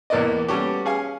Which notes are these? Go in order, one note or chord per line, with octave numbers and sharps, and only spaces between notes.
E2 A2 A#3 B4 D5 D#5
G3 A3 B3 C#4 F#4 G4
C#4 G#4 F5 G#5